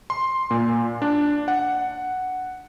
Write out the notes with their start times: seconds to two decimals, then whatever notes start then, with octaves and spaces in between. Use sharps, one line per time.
0.10 C6
0.51 A#2
1.02 D4
1.48 F#5